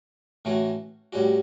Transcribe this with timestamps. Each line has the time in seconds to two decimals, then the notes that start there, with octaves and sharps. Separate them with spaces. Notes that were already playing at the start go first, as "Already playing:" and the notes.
0.45 A2 E3 A3 C#4 F#4
1.13 A2 G3 C#4 F#4